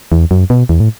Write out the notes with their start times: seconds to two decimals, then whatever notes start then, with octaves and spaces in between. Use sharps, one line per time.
0.12 E2
0.31 F#2
0.50 B2
0.69 E2
0.80 A2